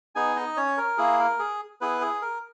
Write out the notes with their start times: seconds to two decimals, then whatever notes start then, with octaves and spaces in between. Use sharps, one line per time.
0.15 B3 D#4 G#4 G#5
0.36 D#4 D#5
0.57 C#4 C#5
0.78 A#4
0.98 A#3 E4 G#4
1.19 A#4
1.39 G#4
1.81 B3 E4 G#4 B4
2.01 G#4
2.22 A#4